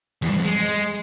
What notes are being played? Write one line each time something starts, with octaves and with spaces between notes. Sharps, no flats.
E2
G2
F2
G#3